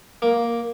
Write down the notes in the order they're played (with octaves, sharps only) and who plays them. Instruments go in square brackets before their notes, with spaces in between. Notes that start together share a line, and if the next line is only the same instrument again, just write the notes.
[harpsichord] A#3